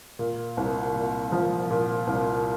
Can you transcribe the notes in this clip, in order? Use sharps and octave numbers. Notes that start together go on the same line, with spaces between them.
A#2
C2
A#2
F3
A#2
C2